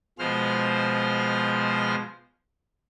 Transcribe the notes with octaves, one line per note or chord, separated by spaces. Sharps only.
B2 F3 G#3 C5 F6